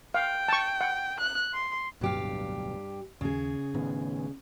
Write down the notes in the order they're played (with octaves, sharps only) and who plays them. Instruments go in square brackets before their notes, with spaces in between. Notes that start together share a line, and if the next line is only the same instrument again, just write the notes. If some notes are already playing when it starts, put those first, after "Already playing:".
[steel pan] F5 [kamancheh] G5
[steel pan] A5 C#6
F#5
[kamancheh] F#6
C6
[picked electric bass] D1 B1 B2 [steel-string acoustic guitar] G2 G4 F5
[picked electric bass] D#2 [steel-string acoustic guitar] C#3 G#4
[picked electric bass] A2 D#3 B3